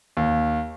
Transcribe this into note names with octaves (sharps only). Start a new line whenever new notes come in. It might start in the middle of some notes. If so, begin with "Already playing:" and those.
D#2